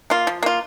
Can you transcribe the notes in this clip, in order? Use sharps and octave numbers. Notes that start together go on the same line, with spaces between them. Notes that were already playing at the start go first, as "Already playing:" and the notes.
A#3 F4
F3
A#3 F4